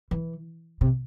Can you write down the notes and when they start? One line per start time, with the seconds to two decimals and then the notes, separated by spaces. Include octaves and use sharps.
0.11 E3
0.81 C3